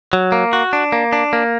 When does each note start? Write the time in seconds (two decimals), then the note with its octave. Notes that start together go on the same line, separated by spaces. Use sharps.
0.13 F#3
0.32 A#3
0.53 F#4
0.73 D4
0.92 A#3
1.13 D4
1.33 A#3